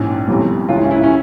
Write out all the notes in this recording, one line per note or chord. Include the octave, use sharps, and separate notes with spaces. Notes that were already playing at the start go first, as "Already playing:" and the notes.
Already playing: A#1 G#2 E3 C#4
G1 F2 C3 E3
C#2 C#3 E3 F4
E4
C#4
E4
C#4